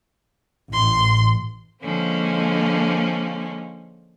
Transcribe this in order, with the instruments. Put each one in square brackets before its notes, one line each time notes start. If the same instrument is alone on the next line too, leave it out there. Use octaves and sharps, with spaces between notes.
[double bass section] A1 [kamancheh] C6
[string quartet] D3 F3 G#3 A#3 C4 C#4